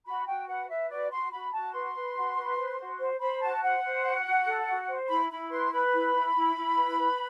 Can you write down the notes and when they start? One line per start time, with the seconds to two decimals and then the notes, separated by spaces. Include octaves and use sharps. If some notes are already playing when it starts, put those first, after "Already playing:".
0.05 F#4 B5
0.27 F#4 G5
0.48 B4 F#5
0.68 B4 E5
0.89 F#4 D5
1.11 F#4 C6
1.31 F#4 B5
1.52 F#4 A5
1.73 B4 C6
1.94 B4
2.15 F#4
2.36 B4
2.58 C5
2.78 F#4
2.99 C5
3.20 C5 B5
3.41 F#4 A5
3.62 C5 F#5
3.83 C5
4.04 F#4
4.25 F#4
4.46 A4
4.67 F#4
4.88 C5
5.09 E4 B5
5.30 E4 B5
5.51 B4 C6
5.72 B4 B5
5.93 E4
6.14 E4
6.35 E4
6.56 E4
6.76 B4
6.98 B4